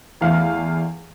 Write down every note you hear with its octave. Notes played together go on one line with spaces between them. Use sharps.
E2 A3 F5